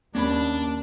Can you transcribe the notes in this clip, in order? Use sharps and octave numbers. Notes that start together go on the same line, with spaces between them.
D#2 A#3 C#4 D4 B5